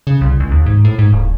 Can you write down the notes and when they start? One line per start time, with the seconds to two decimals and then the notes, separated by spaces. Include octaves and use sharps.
0.07 C#3
0.21 C2
0.40 C#2
0.51 D#2
0.66 G#2
0.85 A2
0.99 G#2
1.13 D1